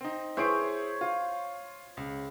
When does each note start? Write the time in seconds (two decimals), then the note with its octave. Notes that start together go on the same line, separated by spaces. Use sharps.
0.01 C4 D#4
0.37 E4 G#4 C5 C#5 D7
1.01 F4
1.97 C#2